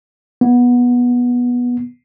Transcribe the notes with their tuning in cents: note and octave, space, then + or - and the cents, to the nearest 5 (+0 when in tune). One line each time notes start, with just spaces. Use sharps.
B3 -15